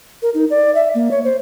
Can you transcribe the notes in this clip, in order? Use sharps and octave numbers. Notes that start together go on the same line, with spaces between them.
A#4
D#4
D5
E5
A#3
C#5
C5